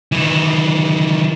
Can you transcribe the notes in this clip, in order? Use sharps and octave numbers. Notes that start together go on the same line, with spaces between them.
D#3 E3